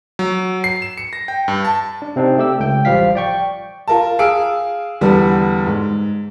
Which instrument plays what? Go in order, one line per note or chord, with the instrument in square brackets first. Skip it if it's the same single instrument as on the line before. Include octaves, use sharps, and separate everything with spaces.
[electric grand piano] F#3
C7
E7
C#7
A#6
G5
G2
A5
[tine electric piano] D4
C3 C4 D4 D#4
A3 G4 E6
C#2 G5
A1 F3 G3 F5 B6
D5 G5 C#6
[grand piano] F4 A#4 A5
G#4 F5 E6 D7
E2 D3 G3 B3
G#2